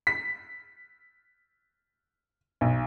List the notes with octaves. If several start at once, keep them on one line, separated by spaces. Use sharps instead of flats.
B6
B1